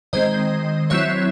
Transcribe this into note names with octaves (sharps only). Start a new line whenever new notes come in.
D#3 G#3 C4 C5 D#5
F#3 C4 E4 C#5 E5